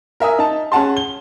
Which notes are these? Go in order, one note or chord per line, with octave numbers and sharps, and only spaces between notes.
A#4 E5 G#5 D#6
D#4 A5
C#4 G#4 F#5 A5 C6
G7